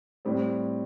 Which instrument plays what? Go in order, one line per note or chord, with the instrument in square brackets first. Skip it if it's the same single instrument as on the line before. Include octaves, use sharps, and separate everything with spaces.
[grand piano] A2 G3 C4